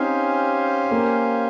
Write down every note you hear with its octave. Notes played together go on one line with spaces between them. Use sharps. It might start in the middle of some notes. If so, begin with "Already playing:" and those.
Already playing: C4 C#4 D#4 G4 C5 F5 G#5
A#3